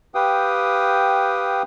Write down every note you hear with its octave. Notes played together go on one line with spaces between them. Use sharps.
G4 B4 F5 G5 D#6